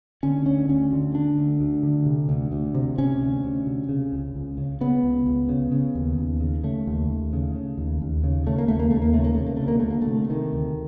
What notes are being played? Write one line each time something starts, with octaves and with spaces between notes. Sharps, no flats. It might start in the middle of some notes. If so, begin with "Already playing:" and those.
D3 C#4
D2 C#4
D2 C#4
D3
D3 D4
D2
D2
D3
C3
D2
D2
C3
C3 C#4
D2
D2
C3
C#3
C#2
C#2
C#3
C#3 B3
C#2
C#2
C#3
C#3
D#2
D#2
C#3
C#3 A3
D#2
D#2
C#3
C#3
D#2
D#2
C#3
C#3 A3
A#3
D#2 A3
A#3
D#2 A3
A#3
C#3 A3
A#3
C3 A3
A#3
D2 A3
A#3
D2 A3
A#3
A3
C3
C3 D#3
D2